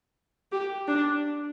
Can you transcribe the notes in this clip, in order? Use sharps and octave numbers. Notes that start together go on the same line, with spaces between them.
G4
D4